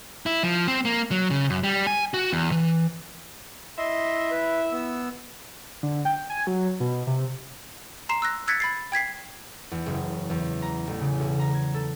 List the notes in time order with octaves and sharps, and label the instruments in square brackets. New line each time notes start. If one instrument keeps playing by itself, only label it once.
[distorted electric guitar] E4
F3
C4
A#3
F#3
C#3
F#2
G3
G#5
F#4
E2
E3
[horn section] E4 E5 [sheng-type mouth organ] D#5 C6
[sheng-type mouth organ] B4
B3 E6
[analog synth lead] D3
G5
G#5
F#3
B2
C3
[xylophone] A#5 C6 C7 E7
E6 F#6 A#6
E6 F#6 G#6 A6 B6 C#7
B5 A6 C7
G5 G#6 B6 C7
[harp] E2
F#1
E2
A#5
A1
C#3
B1
A#5
G#6
A4